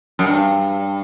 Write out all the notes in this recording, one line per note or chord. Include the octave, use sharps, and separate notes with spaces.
F#2
G2